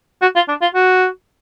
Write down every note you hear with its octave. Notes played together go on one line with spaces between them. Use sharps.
F#4
F4
D4
F4
F#4